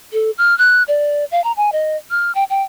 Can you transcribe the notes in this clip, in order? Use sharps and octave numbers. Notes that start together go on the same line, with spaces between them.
A4
F6
F#6
D5
F5
A#5
G#5
D#5
F6
G5
G5